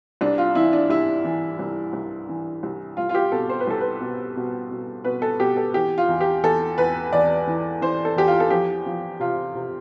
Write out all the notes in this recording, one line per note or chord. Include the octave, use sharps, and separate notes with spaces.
C2 D4
F4
E3 E4
D4
C2 E4
E3
C2
C2
E3
C2
C2 F4
F4
G4
B2 A4
C5
B4
C2 A4
B4
B2
B2
B2
B2 B4
A4
B2 G4
A4
E3 G4
F4
E2
G4
E2 A4
E2 B4
E2 D5
E3
E3 C5
A4
E2 G4
F4
A4
F3 G4
F3
C3 F4
C3